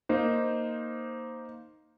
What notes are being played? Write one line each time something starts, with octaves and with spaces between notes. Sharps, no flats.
A#3 D#4 C5